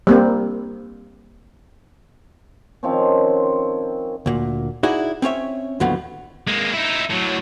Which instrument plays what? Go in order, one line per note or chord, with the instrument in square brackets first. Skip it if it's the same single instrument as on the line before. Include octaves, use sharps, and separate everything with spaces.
[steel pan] G3 A#3 C4
[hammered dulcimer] D#3 F3 C4 C#4
[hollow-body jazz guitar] D2 A#2
D#4 E4 F#4 G#4 D5
C4 C#4 C#5 E5
D#2 A2 D3 F3 F#3 B3
[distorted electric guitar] G#3 A#3
D#4 E4
A2 F#3